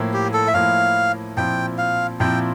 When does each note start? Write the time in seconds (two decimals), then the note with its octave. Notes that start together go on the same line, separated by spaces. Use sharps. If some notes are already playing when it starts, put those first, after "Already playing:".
Already playing: A2 F3 A#3 E4
0.13 G4
0.33 A4
0.48 E5
0.54 A2 F3 A#3 E4 F5
1.37 A#2 F3 C4 E4 G5
1.78 F5
2.20 A#2 F3 C4 E4 G5